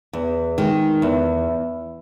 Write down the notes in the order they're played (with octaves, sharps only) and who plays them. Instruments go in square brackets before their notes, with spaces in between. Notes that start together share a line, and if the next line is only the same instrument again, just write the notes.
[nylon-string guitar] E2
D#3 G#3
E2